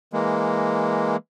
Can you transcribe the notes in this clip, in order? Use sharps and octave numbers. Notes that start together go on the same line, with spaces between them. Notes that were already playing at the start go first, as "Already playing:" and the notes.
E3 G#3 A#3